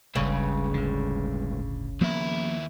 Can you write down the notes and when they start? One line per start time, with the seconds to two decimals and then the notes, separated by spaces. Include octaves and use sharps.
0.16 D1 G1 C#2 G2 C#3
0.74 A2 D3
2.01 D#2 E3 F3 A#3 B3 E4